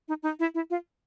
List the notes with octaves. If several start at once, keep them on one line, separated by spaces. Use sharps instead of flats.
D#4
D#4
E4
E4
F4